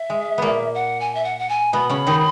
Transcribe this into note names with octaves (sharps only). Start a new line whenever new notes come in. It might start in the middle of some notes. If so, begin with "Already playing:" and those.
Already playing: E5
G#3
A#2 A#3 B3
F#5
G#5
E5
F#5
F#5
G#5
B2 B3 B5
C#3 C#4
D#3 D#4